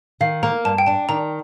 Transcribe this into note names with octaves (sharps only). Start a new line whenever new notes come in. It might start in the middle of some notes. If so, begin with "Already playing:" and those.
D#3 F5
A#3 A#5
G2 A5
G5
D4 A5
D#3 A#5